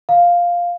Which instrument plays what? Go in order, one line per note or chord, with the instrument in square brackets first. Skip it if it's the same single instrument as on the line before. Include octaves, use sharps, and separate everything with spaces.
[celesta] F5